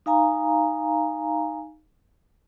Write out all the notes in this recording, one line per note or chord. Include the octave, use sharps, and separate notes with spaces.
D#4 F5 G#5 A#5